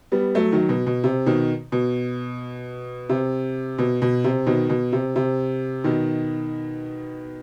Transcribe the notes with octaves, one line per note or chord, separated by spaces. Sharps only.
G3 B3
F#3 A3
D#3 F#3
B2
B2
C3
B2 D#3
B2
C3
B2
B2
C3
B2 D#3
B2
C3
C3
B2 D#3